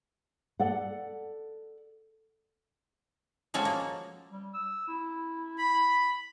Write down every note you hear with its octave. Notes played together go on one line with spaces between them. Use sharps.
A4 D5 F#5
F3 G#3 C#4 F#4 A4
A#3
G3
E6
E4
B5